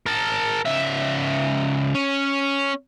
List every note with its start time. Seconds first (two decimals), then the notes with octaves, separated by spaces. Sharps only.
0.06 A#4 A5
0.65 C#2 E5
1.95 C#4